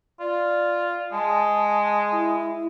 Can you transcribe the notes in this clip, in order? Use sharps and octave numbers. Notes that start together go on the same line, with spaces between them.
F4 D5
G#3 A5
E4